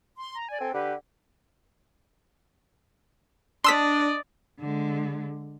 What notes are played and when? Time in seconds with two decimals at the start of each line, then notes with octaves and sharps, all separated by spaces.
0.17 C6
0.35 A#5
0.49 D5 G#5
0.60 C4 A4
0.74 D3 G4 B4
3.64 D4 D5 D#5 C6 E6 B6
4.60 D3 G#3